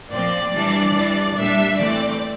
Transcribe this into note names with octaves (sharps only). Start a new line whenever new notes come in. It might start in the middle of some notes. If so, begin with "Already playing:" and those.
A#2 F3 C4 D5
E3 G3 D4
E3 G3 D4
A#2 G3 D4 E5
E3 A3 C4 D5